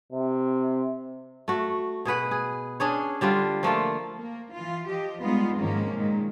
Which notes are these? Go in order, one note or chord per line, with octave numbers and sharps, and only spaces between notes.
C3
A3 F#4
B2 G#4 B4 F#5
G#4
C#4 D4 G#4 C#5
D3 G3 D4 F4
F3 A3 A#3 F4
A#3
E3 F4
F3 G4 D#5
G3 G#3 B3 D#4 F4
G#2 D#3 F3 G#3 A#3 C#4
A#2 D#3 G#3